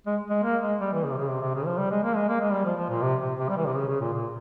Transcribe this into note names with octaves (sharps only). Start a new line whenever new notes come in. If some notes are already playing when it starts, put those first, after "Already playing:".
G#3
G#3
A#3
G#3
G3
E3
C#3
C3
C#3
C3
C3
C#3
F3
G3
G#3
A#3
G#3
A#3
G#3
G3
F3
F3
A#2
C3
C3
C3
G3
E3
C3
C#3
C#3
A#2
A#2